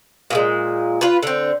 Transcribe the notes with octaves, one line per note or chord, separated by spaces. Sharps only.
A#2 F3 G#3
F4 B4
D3 C4